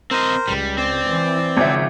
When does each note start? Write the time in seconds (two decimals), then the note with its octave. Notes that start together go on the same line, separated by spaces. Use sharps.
0.11 C4 A#4 C5 D#5
0.48 C#2 G3
0.78 C4 D5
1.08 E3
1.57 G#1 C#3 F3 E5